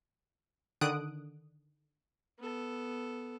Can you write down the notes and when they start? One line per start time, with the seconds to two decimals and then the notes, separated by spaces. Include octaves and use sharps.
0.81 D3 D#3 D#6 F#6 D7
2.39 B3 A4